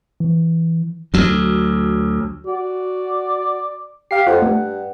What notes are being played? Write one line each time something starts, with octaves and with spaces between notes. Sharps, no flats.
E3
D2 F#3
F#4 D5
G4 F5 C7
F2 F4 F#5
G2 A3